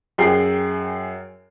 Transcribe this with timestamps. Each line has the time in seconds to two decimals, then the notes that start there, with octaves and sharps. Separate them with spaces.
0.18 F#2 G#4 G5 C7